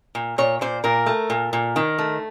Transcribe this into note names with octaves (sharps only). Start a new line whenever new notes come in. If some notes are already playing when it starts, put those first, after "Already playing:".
A#2
A#2 C#5
A#2 C5
A#2 A#4
A3
A#2
A#2
D#3
A3